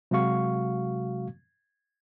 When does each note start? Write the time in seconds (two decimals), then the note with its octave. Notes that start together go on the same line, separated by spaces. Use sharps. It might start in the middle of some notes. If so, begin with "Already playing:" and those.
0.11 C3 F#3 G#3 F#4 F5 C#6